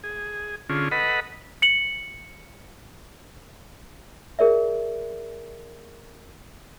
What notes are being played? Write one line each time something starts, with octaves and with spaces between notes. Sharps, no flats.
G#4
D3 C#4 F4 G#4
A4 B4 D#5 F#5 B5
C#7 F#7
G#4 A#4 D5 E5